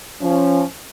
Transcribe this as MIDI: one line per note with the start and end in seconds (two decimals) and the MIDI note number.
0.22 0.63 53
0.22 0.63 61